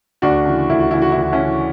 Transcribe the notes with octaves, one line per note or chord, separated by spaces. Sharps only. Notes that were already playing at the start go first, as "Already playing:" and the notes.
D2 D4 F#4
C#3 E3
D2 E4
F#4
C#3 E3 E4
F#4
E4
D2
F#4
C#4 E4
C#3 E3